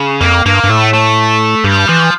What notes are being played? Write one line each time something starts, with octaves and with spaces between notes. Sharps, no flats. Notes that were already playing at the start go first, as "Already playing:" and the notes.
Already playing: C#3
F2 A#3
G2 A#3
G2
A2 A3
A3
G2 G3
E3 F3